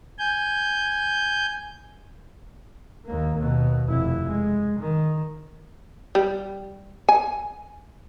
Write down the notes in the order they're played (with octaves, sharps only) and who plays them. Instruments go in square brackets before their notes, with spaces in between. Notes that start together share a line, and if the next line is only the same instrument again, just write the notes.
[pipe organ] G#5 G6
[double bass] D#2 A#3
D#2 B2
F1 E4
G#3
D#3
[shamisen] G3
G#5